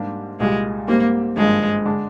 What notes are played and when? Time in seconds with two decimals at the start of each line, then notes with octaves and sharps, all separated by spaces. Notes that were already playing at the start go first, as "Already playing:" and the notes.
Already playing: G#2 G3 A#3 D4 G4
0.40 C2 A#2 G3 G#3
0.88 G#2 G3 A#3 C4 G4
1.37 G#1 G2 F3 G#3
1.85 D3 G#3 D4